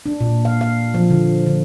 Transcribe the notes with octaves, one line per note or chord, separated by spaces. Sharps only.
D4
A#2
F5
F5
F3
D3
D3